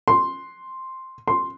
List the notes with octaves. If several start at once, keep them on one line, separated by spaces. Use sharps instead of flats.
C6
C6